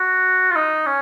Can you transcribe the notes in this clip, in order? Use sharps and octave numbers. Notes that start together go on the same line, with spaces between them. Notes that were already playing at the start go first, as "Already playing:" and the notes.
Already playing: F#4
F4
D#4
C#4